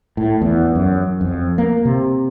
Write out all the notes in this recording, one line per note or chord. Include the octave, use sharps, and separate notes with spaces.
A2
E2
F#2
F2
A#3
C3